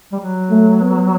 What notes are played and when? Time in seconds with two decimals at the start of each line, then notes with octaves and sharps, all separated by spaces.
0.13 G3
0.20 F#3
0.51 A3
0.81 B3